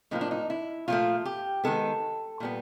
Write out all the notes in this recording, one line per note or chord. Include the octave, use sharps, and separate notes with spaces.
A2 F3 A#3 D#4
D4
D#4
E4
A#2 F3 A3 F4
G4
D#3 G#3 B3 A4
A#2 G3 B3